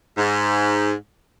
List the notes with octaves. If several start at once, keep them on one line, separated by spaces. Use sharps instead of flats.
G#2